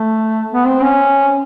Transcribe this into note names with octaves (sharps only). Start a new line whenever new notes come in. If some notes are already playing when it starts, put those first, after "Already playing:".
Already playing: A3
B3
C4
C#4